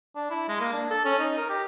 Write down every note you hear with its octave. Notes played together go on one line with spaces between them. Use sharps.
D4
E4
G#3
A#3
D4
A4
C#4
D#4
A#4
G4